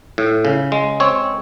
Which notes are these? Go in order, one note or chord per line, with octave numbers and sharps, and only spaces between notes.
A2
C#3
G#3
C4 C#5